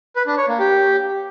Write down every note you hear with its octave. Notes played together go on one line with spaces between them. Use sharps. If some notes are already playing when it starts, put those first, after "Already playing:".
B4
D4
C#5
A#3
G4